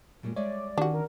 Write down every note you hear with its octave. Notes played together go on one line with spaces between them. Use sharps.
F#2 A#2 G3 G#3
G3 G#3 C#5 D5 E5
D#3 C#4 D4 F#4 G4
A#4